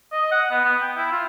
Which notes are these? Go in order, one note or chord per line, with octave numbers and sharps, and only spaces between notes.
D#5
F#5
B3
B3
G5
E4
F4